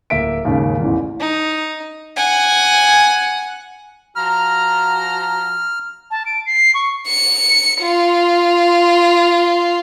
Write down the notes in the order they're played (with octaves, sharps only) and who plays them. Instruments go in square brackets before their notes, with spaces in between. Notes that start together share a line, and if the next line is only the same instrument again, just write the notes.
[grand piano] D1 A#3 E5 B6 D7
D#2 G#2 C#3
A1 E2
[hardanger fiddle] D#4
F#5 G#5
[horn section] F3 F#4 A#5 [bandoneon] F6
[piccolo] A5
D7
C7
C#6
[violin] C#7
F4